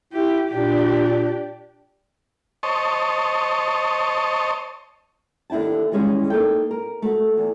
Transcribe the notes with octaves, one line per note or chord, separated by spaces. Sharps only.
E4 G4
A#2 D4 G4
C5 C#5 D#5 A5
D#2 D3 E4 G5 A5
D#3 E3 G3 G#3 C#4 G#4
A#3 D#4 A4 G5
A#4
A3 F#4
E2